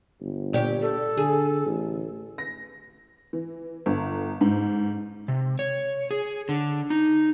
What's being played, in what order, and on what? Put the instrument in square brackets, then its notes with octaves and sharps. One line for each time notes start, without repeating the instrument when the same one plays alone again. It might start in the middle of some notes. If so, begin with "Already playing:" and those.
[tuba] G1
[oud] A#2 G4 C#5
[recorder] A4
[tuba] D3 [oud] G#4
[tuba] A1
[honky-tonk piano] A#6
E3
G1
G#2
[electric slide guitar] C3
C#5
G#4
D3
D#4